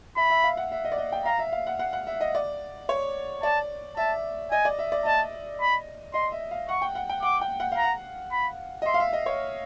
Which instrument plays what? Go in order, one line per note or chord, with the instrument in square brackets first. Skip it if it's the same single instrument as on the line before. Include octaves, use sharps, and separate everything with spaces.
[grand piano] E5 [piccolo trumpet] B5
[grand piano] E5
F5
F#5
E5
D#5
D5
D#5
G5
[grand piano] F5 [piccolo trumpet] A#5
[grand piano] E5
F5
F#5
F#5
F#5
E5
D#5
D5
C#5
[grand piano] D5 [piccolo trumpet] A5
[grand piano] E5 [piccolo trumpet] A5
[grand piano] D#5 [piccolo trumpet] G#5
[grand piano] D5
E5
D5
[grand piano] D#5 [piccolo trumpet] A5
[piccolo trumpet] B5
[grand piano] D#5 [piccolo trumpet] C6
[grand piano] E5
F5
[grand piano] F#5 [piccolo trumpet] C#6
[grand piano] G5
F#5
G5
[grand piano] F#5 [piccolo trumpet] D6
[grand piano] G5
F#5
F5
[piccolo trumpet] A#5
[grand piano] F#5
[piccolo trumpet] B5
[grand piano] D#5
[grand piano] E5 [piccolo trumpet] C6
[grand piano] F5
E5
D#5
C#5